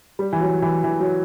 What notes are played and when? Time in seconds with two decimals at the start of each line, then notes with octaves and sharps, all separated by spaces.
0.19 G3
0.33 E3
0.40 F#3
0.62 E3
0.84 E3
1.00 F#3